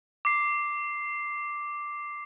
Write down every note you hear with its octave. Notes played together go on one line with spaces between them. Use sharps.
D6 C7